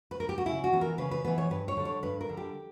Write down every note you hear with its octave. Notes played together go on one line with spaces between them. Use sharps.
B4
A#4
G4
F#4
C#3 E4
F#4
E3 B3
A#4
C#3 B4
B4
E3 B3 B4
C#5
G2 B4
C#5
D3 G3
C#5
G2 B4
A#4
D3 G3
G4